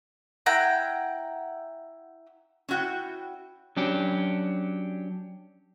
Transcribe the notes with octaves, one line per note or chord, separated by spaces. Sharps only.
E4 F#5 G5 A#5
C#4 E4 F#4 F#5 G5
F#3 C#4 D4 G4